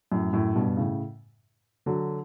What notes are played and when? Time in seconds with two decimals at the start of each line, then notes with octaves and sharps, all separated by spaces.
0.11 F#2 A2
0.33 F#2 A2
0.55 G2 B2
0.77 A2 C#3
1.86 D3 F#3